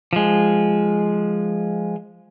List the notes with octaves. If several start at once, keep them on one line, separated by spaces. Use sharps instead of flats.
F3 G#3